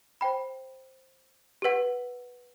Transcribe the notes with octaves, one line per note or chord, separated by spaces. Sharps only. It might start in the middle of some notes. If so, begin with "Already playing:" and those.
C5 G5 B5
G4 B4 F#5